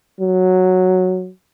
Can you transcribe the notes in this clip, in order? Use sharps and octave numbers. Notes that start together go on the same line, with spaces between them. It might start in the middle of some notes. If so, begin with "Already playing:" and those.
F#3